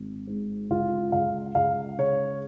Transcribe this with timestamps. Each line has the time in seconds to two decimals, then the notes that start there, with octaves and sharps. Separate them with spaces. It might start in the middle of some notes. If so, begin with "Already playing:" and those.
Already playing: G#1
0.27 G#2
0.70 C#2 F4
1.12 C#2 F5
1.55 C#2 F5
1.98 C#3 C#5